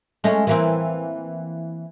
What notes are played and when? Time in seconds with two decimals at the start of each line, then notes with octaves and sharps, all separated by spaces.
0.24 G#3 A3 C#4
0.47 E3 A#3 C4